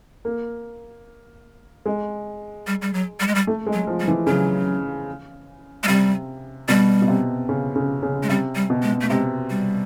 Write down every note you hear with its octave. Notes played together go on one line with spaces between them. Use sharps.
A#3
G#3
G3
G3
F#3
G3
G#3
G3
A3
G#3
F#3
F3
G3
E3
C#3 F#3
G#3
C3 G3
B2 G3
B2
C3
C#3
C#3
C#3
G#3
C3 G3
G3
B2
G#3
A3
C3 G#3
G3